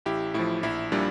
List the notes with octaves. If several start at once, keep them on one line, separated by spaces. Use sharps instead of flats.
A1 E4 G4
A2 F3 E4
A#1 E4
A#2 G3 D4